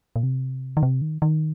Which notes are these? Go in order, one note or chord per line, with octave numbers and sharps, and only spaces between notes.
A#2
C3
D#3
C3
D#3
D#3